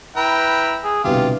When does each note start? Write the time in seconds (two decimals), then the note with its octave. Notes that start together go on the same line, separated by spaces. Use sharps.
0.16 E4 B4 G5 A#5
0.84 G#4
1.04 C2 B2 D3 F4 G4